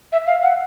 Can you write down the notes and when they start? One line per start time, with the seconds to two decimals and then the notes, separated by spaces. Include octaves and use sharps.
0.12 E5
0.27 F5
0.43 F#5